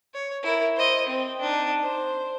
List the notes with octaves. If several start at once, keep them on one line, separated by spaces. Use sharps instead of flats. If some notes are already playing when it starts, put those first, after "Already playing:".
C#5
E4 A#4
C5 D#5
C4
D4 D#4
C5